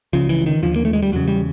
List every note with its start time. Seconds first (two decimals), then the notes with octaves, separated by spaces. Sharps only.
0.13 C#2 C#3 F3
0.29 E3
0.46 D#3
0.62 D#2 D3 F3
0.76 A#3
0.85 A3
0.93 G#3
1.02 G3
1.12 E2 C#3 F#3
1.28 G3